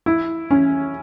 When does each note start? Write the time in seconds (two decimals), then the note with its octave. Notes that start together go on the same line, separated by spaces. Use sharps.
0.06 E4
0.50 C#4